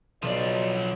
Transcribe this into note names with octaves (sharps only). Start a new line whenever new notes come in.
B1 F3 F#4 B4 D5 D#5